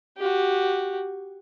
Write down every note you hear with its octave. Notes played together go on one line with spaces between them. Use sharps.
F#4 G4